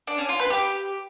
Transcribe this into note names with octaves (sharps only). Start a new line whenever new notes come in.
D4
C#4
F4
B4
G4